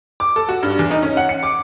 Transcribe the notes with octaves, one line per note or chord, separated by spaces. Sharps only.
D6
A4
F#4
G2
E2
D#4
C#4
F#5
C#7
D6